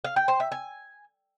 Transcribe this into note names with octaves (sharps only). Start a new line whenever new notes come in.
F5
G5
C5
E5
G#5